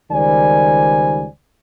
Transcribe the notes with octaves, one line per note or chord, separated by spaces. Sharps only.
C#2 D#3 G3 C5 D5 G#5